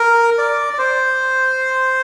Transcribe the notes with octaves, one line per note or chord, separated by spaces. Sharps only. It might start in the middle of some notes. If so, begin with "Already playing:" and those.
Already playing: A#4
D5
D5
C5